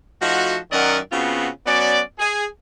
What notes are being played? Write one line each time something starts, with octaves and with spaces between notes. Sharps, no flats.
F3 A3 D#4 F#4
F#2 D#3 A#4 D5 D#5 F#5
C#3 B3 C4 F4 F#4
F#3 B3 C#4 D5
G#4